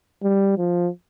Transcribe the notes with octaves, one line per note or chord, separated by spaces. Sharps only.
G3
F3